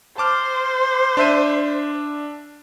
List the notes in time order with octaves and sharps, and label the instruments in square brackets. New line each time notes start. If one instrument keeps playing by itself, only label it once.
[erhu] C5 [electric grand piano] A5 D6 F6
[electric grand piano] D4 E5 D#7